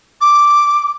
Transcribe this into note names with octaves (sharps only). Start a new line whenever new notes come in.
D6